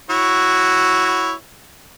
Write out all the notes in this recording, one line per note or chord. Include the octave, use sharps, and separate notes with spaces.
E4 F#4 C#5